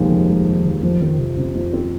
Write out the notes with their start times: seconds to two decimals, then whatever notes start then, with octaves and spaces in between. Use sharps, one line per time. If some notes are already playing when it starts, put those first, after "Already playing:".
Already playing: F1 D#2 D#3 F3 G#3
0.11 F1
0.29 G#3
0.47 D#3
0.65 D#2
0.83 F2 F3
1.01 D#3 C4
1.19 C3 F3
1.37 C3
1.55 F2
1.73 C4